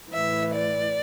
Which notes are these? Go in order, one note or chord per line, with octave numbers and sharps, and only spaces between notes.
A2 E3 E5
D5